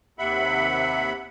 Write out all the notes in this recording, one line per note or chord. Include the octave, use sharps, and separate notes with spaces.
D#2 C3 E5 F#5 B5